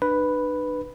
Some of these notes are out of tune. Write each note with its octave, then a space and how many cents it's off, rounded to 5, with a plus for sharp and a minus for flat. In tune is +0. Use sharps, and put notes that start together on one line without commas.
D4 +40 B4 +0